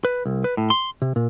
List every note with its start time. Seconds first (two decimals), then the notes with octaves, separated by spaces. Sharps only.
0.05 B4
0.26 C2
0.44 B4
0.57 A2
0.70 C6
1.02 C3
1.16 A#2